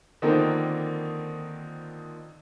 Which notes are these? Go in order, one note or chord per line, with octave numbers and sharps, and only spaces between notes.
D3 D#3 F3 A#3 C4 D#4